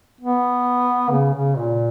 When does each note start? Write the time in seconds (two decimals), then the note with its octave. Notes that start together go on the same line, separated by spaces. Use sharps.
0.21 B3
1.11 C#3
1.33 C#3
1.57 A#2